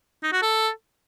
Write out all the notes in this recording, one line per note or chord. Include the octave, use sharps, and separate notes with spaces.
D#4
F#4
A4